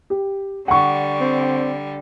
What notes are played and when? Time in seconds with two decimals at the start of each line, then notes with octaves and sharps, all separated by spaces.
0.10 G4
0.68 D3 G3 F#5 C#6
1.21 C4